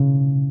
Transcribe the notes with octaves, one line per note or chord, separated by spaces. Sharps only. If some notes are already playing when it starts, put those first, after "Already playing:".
Already playing: C#3